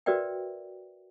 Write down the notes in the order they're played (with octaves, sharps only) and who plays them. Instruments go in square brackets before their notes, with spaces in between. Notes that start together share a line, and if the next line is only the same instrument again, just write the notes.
[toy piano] F#4 A#4 B4 D5 E5 G5